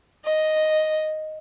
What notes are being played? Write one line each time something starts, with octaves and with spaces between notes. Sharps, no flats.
D#5